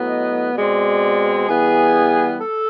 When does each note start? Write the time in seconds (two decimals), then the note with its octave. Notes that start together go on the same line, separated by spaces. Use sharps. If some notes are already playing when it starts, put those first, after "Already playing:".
Already playing: A2 F#3 B3
0.09 D#5
0.55 B2 G#3 C4 D5
1.47 E3 G3 B3 G#4
2.39 A4